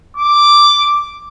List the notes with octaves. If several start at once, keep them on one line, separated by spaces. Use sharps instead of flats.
D6